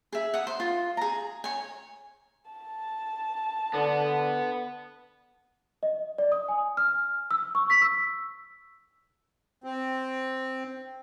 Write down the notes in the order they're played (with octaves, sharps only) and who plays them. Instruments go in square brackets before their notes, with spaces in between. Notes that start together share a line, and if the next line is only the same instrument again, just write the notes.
[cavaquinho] G#4 E5
F#5 D#6
C5
F4
G#4 A#5
C#5 G#5
[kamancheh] A5
[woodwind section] D3 [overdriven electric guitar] B3
[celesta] D#5
D5
D#6
G#5
F6
E6
C#6
B6
E6
[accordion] C4